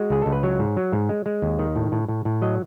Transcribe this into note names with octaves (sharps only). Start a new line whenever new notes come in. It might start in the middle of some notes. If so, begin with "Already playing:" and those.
Already playing: G#3 F#4
C#2 G#4
C#2 A4
B4
F#3 C#5
G#2
F#3
G#2
G#3
G#3
D#2
D#3
A2
A2
A2
A2
F#3 D#5